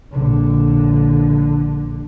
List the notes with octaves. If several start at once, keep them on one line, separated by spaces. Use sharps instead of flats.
A#1 D3